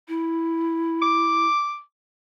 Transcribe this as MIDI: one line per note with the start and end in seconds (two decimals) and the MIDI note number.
0.08 1.47 64
1.02 1.80 86